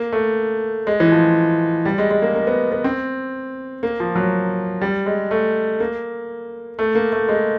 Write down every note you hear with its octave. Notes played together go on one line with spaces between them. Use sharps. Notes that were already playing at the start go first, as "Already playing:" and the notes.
Already playing: A#3
A3
G#3
E3
F3
G3
G#3
G#3
A#3
A#3
B3
B3
C4
A#3
F3
F#3
G3
G#3
A3
A#3
A3
A#3
A3
G#3